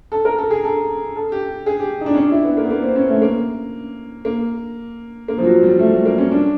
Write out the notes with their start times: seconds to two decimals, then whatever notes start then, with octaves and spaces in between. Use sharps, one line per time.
0.12 A4
0.25 A#4
0.38 A4
0.51 G#4
0.64 A4
1.16 A4
1.32 G4
1.66 G#4
1.80 G4
2.01 D#4
2.06 D4
2.15 C#4
2.18 D4
2.31 E4
2.44 B3
2.57 A#3
2.64 B3
2.70 A#3
2.83 C4
2.96 C#4
3.09 A3
3.22 A#3
4.25 A#3
5.28 A#3
5.38 F3
5.45 F#3
5.63 G3
5.79 A3
5.93 A3
6.06 A#3
6.18 C#4
6.31 D4